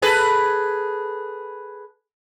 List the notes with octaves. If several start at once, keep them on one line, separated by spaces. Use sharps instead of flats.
G#4 A4 B4